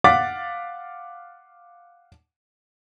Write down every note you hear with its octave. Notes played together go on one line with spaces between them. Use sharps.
F5 F#5 D6 A6 B6